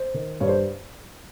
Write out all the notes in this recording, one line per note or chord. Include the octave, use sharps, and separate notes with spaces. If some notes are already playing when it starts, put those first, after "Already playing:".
Already playing: C5
D#3
G2 C#5
C5